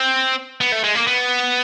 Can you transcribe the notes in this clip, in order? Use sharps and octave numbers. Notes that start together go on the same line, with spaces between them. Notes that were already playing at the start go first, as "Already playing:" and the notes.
Already playing: C4
B3
A3
G#3
A#3
B3